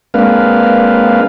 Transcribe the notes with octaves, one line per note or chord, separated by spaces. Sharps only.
G#3 A#3 C4 D4 B4 F5